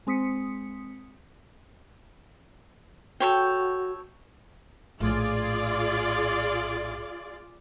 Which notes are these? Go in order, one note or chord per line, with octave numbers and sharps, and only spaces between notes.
G#3 C4 D#6 B6 C#7
F#4 A4 C#5 G5
A#1 A2 F4 G#4 D5